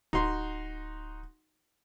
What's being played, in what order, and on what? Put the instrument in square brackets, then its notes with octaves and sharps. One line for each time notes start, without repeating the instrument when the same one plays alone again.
[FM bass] D1 [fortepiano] D#4 F#4 C6